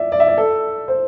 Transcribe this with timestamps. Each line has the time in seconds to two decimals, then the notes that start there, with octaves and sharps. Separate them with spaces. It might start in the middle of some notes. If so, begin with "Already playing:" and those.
Already playing: D5 E5
0.12 D5
0.20 E5
0.28 D5
0.38 A4
0.88 C5